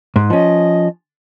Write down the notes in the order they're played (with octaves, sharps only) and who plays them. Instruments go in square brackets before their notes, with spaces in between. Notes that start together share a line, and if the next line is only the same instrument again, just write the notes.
[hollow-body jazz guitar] G#2
[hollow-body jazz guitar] F3 C#4 [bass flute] D#5